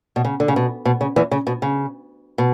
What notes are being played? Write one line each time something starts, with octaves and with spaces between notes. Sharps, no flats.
B2
C#3
D3
C#3
B2
B2
C#3
E2 E3
C#3
B2
C#3
B2